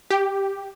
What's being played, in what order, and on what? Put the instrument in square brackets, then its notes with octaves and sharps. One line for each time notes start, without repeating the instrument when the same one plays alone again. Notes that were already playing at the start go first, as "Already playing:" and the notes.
[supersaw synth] G4